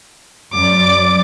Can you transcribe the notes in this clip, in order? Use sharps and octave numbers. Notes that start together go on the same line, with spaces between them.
F#2 D5 D6